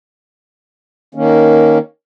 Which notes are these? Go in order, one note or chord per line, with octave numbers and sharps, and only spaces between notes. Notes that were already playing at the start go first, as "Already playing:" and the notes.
D#3 A#3 C#4